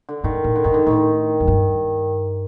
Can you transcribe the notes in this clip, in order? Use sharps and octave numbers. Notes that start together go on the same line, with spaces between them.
D3
G#2 D#3
A2
D3
G#2 D#3
D3
A2 D#3
F#2
G2